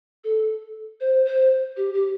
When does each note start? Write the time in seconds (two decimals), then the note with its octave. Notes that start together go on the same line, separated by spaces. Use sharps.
0.24 A4
1.01 C5
1.26 C5
1.77 G4
1.94 G4